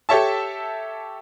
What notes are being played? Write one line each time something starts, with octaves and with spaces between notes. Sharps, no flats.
G4 A4 C#5 E5 A5